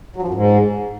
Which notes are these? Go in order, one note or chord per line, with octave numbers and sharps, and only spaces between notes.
F#3
F3
F#2
G#2